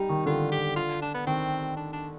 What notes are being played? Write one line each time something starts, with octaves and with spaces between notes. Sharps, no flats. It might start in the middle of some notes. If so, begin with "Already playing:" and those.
Already playing: G3 D#4
D#3
D3 F4
G4
F4
D4
B3
D#3 C4
D4
D4